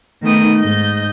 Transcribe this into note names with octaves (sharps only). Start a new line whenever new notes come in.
D#3 A3 B3 D#4 G5 D#6
G#2 D#5 G6